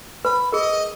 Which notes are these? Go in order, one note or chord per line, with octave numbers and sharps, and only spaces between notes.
B4 B5
G#4 A#4 D#5